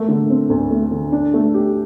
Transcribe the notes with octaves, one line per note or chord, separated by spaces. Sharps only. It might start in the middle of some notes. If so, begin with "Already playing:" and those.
Already playing: A3 A#3
D3
C4
D2
A3
D3
D4
A3
G4